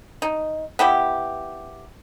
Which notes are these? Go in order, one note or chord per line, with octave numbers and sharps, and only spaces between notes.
D#4
B3 E4 G4